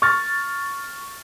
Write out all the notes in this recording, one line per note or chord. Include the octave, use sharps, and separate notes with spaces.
C#6 F6 A6